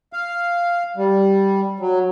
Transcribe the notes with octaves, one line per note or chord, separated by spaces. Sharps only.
F5
G3
F#3